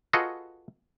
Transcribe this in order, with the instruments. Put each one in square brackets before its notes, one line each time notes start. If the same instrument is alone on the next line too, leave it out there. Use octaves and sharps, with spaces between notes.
[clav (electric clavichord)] F4 F#4 G#4 A4 B4 D#5